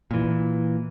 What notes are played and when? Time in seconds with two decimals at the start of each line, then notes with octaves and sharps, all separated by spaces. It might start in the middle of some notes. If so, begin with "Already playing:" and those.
0.11 A#2 E3